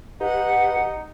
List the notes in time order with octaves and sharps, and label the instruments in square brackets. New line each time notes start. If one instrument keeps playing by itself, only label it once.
[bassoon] D#4 [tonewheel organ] G4 B4 [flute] F#5